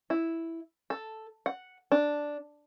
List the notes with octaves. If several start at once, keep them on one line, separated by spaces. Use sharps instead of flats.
E4
A4
F#5
D4